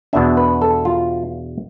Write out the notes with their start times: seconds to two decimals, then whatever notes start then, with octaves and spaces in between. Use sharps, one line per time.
0.13 E2 B2 B3 D4 E5
0.37 B4
0.62 A4
0.85 F4